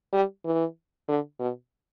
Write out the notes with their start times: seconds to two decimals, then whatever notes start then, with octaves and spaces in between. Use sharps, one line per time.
0.13 G3
0.45 E3
1.09 D3
1.40 B2